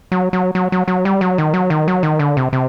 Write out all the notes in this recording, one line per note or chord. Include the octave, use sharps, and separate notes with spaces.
F#3
F#3
F#3
F#3
F#3
G3
F#3
D#3
F#3
D#3
F#3
D#3
D3
C3
C3